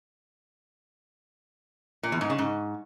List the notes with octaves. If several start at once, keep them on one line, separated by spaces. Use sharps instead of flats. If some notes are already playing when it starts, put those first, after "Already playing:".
A#2
E2
G#2
C#3
G#2